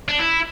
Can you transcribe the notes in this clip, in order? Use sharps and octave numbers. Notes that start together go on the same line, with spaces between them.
D4
E4